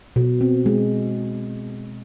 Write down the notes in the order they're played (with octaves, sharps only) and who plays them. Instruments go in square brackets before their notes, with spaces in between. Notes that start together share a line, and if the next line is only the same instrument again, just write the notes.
[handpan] B2
C4
G#3